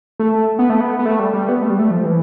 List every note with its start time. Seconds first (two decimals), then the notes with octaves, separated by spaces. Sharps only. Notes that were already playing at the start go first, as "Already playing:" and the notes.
0.20 A3
0.59 B3
0.70 A3
0.80 B3
0.99 B3
1.05 A3
1.20 G3
1.34 G3
1.49 B3
1.62 A3
1.70 G3
1.79 A3
1.91 F3
2.05 E3